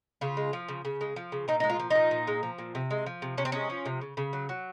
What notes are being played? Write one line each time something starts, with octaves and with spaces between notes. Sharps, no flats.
C#3 F4
G#3
F3
C#3
C#3
G#3
F3
C#3
A#2 D#4
G#3 D#4
F4
F3
A#2 D#4
A#2
G#3
F3
A#2
C3
G#3
F3
C3
C3 C#4
C4
G#3 C#4
F3
C3
C#3
C#3
F#3
F#3